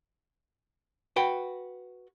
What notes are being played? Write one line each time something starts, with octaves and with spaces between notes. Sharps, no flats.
F#4 B4 G5